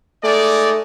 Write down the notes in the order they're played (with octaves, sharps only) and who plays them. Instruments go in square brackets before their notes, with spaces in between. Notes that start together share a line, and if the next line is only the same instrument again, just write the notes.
[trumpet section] G#3 D#4 D5 [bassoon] A3